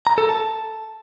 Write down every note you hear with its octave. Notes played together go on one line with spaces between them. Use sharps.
A#5
A4
A5